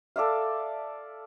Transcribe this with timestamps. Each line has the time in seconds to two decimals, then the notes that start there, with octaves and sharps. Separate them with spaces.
0.16 A4 D5 E5 F5